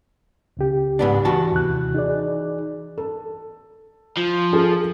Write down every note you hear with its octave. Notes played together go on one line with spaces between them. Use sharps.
C#2 C#3 G4
G#2 B3 D4
E3 F#4 A5
D#2 C3 F#6
D#4 G#4 D5
A4
F3
F4 G#4 A4